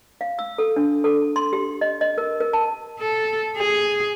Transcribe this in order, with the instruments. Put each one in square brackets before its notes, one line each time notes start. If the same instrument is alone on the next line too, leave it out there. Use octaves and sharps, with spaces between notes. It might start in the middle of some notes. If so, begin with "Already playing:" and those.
[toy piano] F5
E6
A4
D4
A4
C6
G4
D#5
D#5
A#4
A#4
A5
[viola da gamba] A4
G#4